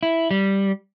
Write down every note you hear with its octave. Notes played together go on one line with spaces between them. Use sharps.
E4
G3